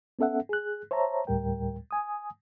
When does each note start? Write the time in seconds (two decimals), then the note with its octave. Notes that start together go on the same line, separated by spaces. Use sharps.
0.19 B3 C#4 A4 E5 F#5
0.49 G#4 F#6
0.91 C5 C#5 E5 A5 A#5
1.27 D2 A2 G3 A#4 G5
1.91 G#5 D#6